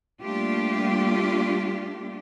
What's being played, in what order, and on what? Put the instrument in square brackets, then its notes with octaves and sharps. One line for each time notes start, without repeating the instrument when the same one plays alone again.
[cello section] G3 A3 A#3 D4 F4 G4